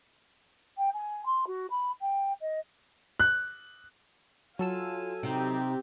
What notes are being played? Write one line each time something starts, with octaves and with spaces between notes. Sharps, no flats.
G5
G#5
C6
F#4
B5
G5
D#5
F#6
F#3 F4 A4 F5 G#5 E6
C3 C4 D#4 G4